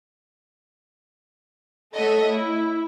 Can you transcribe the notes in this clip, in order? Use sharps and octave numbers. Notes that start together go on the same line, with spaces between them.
A3 A4 C#5 D#5 E5 F#5
E4